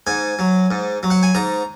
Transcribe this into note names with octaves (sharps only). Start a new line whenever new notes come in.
G#2 G#5
F#3
G#2
F#3
F#5
G#5
G#2 A#5